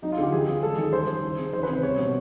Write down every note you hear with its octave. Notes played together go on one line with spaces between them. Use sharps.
F#3 D#4
F4
D3 G4
E3 G#4
C#3 G#4
G#3 A4
D#3
G#4
G3 C5
D#3
E3
C#3
D#3 C5
C3 B4
C5
G3 C#5
B2